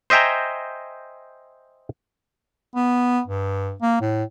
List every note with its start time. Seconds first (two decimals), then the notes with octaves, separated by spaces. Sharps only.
0.10 C5 D#5 E5 G5 G#5 A#5
2.76 B3
3.27 G2
3.82 A#3
4.01 A2